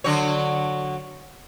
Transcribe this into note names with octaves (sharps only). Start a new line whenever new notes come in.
D3 F#3 C#5